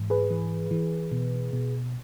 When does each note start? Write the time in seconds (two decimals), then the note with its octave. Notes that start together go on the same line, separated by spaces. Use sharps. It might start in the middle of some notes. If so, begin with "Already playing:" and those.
Already playing: G#2 E3
0.10 G#4 B4
0.31 E3
0.71 E3
1.12 B2
1.53 B2